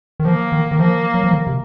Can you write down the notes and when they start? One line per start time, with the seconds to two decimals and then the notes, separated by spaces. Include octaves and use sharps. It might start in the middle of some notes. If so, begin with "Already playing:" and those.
0.20 D#3
0.25 F3 A#3
0.52 D#3
0.71 D#3
0.79 F3 A#3
1.14 F#3
1.24 F3
1.33 D#3
1.47 C3